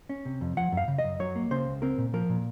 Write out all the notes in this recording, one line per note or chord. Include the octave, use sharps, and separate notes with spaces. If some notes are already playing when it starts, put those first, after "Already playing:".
C#4
C3
F2
F3 F#5
F#2
F5
C#3
D#5
F#2
F#3 C#5
A#3
C#3 C5
C#2
C4 A#4
A#2
F3 A#4
A#2